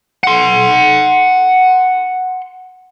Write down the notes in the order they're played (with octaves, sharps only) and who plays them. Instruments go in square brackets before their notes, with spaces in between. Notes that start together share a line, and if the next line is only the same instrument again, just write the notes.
[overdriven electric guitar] F#5 C6